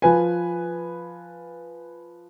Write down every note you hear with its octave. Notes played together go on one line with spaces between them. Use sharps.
F3 B4 G#5